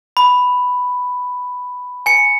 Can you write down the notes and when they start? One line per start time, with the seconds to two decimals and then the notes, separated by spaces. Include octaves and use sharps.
0.17 B5
2.06 G#5 C#7